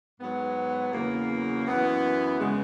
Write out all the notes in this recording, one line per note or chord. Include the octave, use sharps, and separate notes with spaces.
G#2 F#3 B3
E2 C#3 F#3 A#3
F#2 E3 B3
E2 C#3 G#3